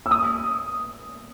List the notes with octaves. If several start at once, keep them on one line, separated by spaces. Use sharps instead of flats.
E6
D#6